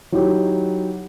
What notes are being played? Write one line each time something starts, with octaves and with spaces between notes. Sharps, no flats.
F#3 D#4 E4 G4